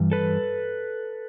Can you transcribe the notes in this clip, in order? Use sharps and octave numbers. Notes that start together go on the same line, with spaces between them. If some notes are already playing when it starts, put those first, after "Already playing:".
Already playing: G2 E3
A4 B4